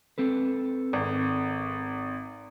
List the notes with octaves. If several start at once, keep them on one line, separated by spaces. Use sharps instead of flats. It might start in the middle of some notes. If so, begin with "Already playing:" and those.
C4 A4 B4
G#1